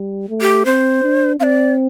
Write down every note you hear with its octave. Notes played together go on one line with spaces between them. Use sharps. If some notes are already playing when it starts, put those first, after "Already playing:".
Already playing: G3
A3
G4
C4 C5
D4
C4 D5 F5